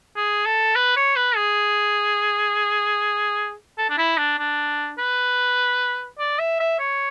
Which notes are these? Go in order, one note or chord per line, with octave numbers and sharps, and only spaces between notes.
G#4
A4
B4
C#5
B4
G#4
A4
D4
E4
D4
D4
B4
D5
E5
E5
C#5